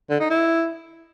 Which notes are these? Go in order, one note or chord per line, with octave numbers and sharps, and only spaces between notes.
D3
D#4
E4